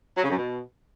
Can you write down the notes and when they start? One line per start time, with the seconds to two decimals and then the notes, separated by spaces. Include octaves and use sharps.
0.17 F#3
0.24 C#3
0.30 F#2
0.37 B2